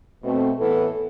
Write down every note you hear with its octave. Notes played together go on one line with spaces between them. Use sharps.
B2 A3 C4
A2 E3 B3 A4